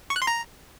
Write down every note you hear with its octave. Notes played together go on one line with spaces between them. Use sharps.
C#6
F#6
C6
A#5